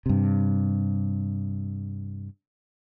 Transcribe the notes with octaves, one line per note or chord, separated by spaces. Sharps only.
G2 C3